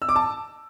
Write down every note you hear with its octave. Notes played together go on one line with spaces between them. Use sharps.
E6
D6
A5